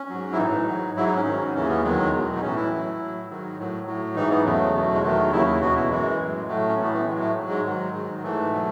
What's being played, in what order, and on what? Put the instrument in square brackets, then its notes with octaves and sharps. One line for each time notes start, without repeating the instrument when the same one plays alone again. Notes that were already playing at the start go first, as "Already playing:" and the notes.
Already playing: [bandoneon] C#4
G#2 F#3
E4
A2 E3 D#4
G#2 F#3
G#2 F#3 E4
D#4
C#4
G#2 D#3 F#3
D#2 C#3 E3 C#4
B3
E2 D#3 F#3 G#3
E2 B2 F#3
D#4
A2 E3 C#4
E4
A2 F#3
A2
F#3
G#2 D#3 F#3
A2 F#3
A2 F#3
G#2 E3 D#4
B3
E2 C#3 F#3 A3
E2 B2 F#3
G#3
E2 D#3 F#3 A3
D#2 C#3 F#3 E4
E4
E2 B2 F#3 F#4
E4
F#2 E3 G#3
A2 F#3
A2 F#3 A3
C#4
A2 E3 B3
A3
A2 F#3 G#3
A3
G#2 F#3
G#3
G#2 D#3 F#3
G#2 D#3 F#3
G#2 E3 A3
B2 F#3